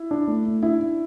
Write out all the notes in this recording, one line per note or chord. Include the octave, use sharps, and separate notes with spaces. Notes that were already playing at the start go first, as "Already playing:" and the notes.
Already playing: E4
D4
A3
A3
D4 E4
D4